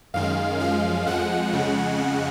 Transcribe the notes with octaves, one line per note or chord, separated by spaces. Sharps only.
F#2 D#3 G#3 F5
F#2 F3 G#3 F5
F2 F3 G#3 F#5
F2 C#3 G#3